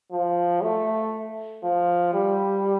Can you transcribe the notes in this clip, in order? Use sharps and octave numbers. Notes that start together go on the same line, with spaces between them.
F3
A3
F3
G3